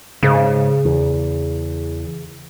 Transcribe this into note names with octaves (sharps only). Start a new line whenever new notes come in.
G#2 C#3
E2